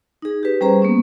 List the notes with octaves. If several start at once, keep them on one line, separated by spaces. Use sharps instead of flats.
D#4 G#4
G4 B4
G3 C#4 G#4 C5 A#5
A#3 B3 C#4